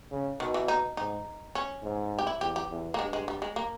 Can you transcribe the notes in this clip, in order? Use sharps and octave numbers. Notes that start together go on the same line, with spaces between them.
C#3
B2 D#3
E3
D#4
G#2 D#4
C#4
G#2
G4
E4
E2 G4
G4
E2
A#3
G2 G#3
G#3
G3
G#3
A#3